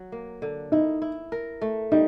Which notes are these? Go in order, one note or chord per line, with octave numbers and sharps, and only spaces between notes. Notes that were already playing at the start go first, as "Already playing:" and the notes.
Already playing: F#3
A#3
D3
D#4 E4
E4
A#4
A3
G3 D#4